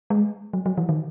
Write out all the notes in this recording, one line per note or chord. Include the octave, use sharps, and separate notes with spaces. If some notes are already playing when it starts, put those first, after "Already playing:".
G#3
F#3
F#3
E3
D#3